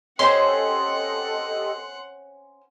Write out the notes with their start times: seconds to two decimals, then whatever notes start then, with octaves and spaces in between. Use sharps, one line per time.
0.19 C#4 G4 A4 C5 D#5 F#5 C6